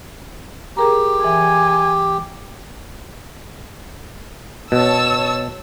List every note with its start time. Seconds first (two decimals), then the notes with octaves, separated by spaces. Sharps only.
0.77 G4 G#4 A#4 A#5
1.25 E3 G#5
4.72 B2 C#5 A5 E6